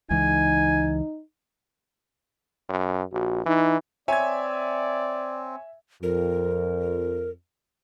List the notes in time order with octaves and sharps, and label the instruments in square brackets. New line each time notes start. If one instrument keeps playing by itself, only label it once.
[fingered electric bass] C#2 E3 G#3 [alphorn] D#4 [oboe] G#5
[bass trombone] F#2
[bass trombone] A#1 [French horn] F#4
[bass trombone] E3 [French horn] D#4
[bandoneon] C4 [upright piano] C#5 G#5 [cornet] D5 [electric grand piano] E5 G#6
[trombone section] F2 [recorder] A#4